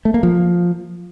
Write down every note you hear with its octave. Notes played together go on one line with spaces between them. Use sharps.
A3
A#3
F3